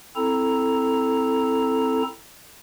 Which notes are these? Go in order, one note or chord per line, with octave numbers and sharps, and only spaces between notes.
C4 E4 A4 A#5